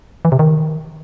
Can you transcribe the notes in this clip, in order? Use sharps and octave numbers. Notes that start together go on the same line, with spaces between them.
E3
C3
D#3